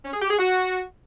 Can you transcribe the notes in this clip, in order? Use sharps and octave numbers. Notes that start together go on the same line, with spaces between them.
C#4
G#4
G4
G#4
F#4